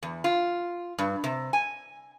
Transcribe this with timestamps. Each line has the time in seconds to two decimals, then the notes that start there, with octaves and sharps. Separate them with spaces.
0.03 E2
0.24 F4
0.98 G2
1.24 C3
1.53 G#5